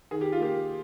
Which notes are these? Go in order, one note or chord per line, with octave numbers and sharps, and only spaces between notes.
D#3 G#4
G4
F4
A#3 G4